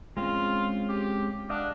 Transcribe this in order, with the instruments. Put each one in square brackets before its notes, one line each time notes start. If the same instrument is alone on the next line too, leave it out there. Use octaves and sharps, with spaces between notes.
[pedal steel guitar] G#3 C4 C#4 [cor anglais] F4
[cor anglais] G4
[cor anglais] D4 [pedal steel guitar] D#5 F5 F#5